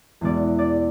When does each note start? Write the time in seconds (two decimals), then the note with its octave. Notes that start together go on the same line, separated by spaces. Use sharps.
0.21 E2 B2 G#3 D5
0.59 D5